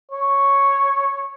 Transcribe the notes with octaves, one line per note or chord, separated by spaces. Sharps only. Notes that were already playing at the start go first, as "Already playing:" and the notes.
C#5